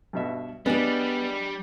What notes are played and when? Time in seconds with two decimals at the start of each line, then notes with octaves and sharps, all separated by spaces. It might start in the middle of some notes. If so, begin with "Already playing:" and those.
0.13 G2 B2 E5
0.66 G3 G#3 B3 D4 G4